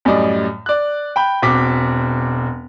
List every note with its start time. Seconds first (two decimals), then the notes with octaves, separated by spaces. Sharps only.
0.05 F#2 A2 G3 D5 D#5
0.66 D5 F#6
1.16 G5 B5
1.42 E1 C4 F#4 D6 B6